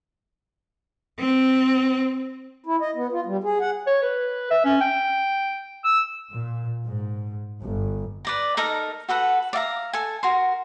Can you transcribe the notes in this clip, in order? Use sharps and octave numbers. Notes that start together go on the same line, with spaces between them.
C4
E4
D#5
B3
F4
G3
G#4
F#5
C#5
B4
E5
C#4
G5
E6
A#2
G#2
G1
B4 D5 A#5
D#4 A4 A#4 A#5
F#4 A4 B4 F#5
D5 E5 F5 A#5
A4 G#5
F#4 A#4 C6